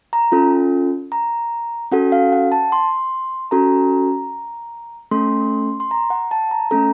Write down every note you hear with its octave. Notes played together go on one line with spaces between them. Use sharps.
A#5
C#4 F4 A4
A#5
C#4 F#4 A4 F#5
F5
F#5
A5
C6
C#4 F#4 A4 A#5
A3 C#4 A4 C6
C6
A#5
F#5
A5
A#5
A3 C#4 A4 A#5